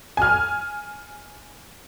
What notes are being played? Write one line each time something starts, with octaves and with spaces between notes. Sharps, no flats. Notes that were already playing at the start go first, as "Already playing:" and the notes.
G#5 F6